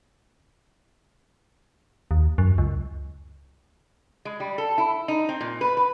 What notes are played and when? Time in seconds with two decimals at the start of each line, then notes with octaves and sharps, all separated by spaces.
2.11 D#2
2.38 F#2
2.58 C#2
4.25 G#3
4.40 G3
4.58 A4
4.78 E4
5.08 D#4
5.29 C4
5.41 A#2
5.61 B4
5.77 B4